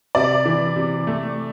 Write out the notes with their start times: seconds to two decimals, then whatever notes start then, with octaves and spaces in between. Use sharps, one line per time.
0.15 C3 D5
0.46 E3
0.76 C3
1.07 A3